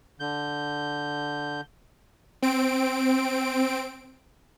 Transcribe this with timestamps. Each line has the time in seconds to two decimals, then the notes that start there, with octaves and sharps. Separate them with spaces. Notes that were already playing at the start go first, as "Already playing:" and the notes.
0.20 D3 G6
2.42 C4 D7